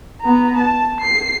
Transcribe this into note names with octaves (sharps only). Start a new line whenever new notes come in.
B3 A#5
A5
C7